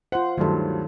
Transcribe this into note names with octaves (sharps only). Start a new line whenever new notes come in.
F4 C5 F#5
D2 G2 D#3 F#3 A4